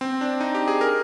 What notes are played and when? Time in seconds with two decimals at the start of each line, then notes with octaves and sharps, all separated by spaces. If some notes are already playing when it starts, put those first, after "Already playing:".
0.01 C4
0.21 D4
0.40 D#4
0.55 G4
0.68 G#4
0.81 A#4